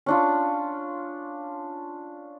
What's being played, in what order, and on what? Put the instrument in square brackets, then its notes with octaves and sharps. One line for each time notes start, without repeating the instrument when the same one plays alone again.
[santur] C#4 D4 F4